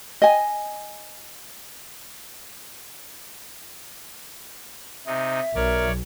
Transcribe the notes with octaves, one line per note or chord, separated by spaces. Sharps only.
D#5 G#5
C3 D#4 E5
B1 A#4 C#5 D5